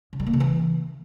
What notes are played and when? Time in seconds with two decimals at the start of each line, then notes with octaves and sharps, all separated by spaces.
0.13 C#3
0.20 G3
0.27 A#3
0.33 C#3
0.40 E3